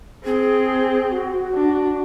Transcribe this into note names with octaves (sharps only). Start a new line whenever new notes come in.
C4 G#4
F#4
D4